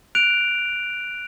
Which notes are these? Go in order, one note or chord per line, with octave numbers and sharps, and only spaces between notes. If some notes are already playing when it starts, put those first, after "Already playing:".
F#6 D7 F7